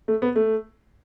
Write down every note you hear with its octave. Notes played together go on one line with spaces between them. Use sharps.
A3
B3
A3